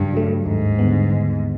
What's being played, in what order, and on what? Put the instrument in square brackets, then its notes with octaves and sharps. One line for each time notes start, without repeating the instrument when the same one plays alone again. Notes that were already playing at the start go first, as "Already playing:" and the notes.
Already playing: [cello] G2 [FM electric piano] C#3 F#3
[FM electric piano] F#3 A3
[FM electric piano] D#2 [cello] G#2
[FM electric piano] D3 G3 B3
D#2